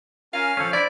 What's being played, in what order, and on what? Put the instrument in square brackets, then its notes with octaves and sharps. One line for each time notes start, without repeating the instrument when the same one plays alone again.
[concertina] C#4 A#4 G#5 [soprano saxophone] F5
[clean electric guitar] F3 C#4 [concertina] A4 C#5
[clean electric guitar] E4 [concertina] C5 [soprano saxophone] D5